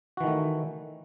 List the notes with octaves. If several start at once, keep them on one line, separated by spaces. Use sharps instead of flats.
D#3 E3 A3 F#4